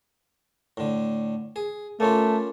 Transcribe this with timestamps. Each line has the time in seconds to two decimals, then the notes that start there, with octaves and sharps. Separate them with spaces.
0.77 A2 D3
1.56 G#4
2.00 A3 A#3 C#4 F4